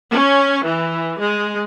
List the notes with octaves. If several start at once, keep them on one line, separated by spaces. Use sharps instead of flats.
C#4
E3
G#3